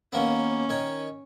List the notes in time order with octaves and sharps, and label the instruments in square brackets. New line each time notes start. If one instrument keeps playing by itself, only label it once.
[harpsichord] D#2 A#3 B3 [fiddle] C#4
[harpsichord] D#3 C#5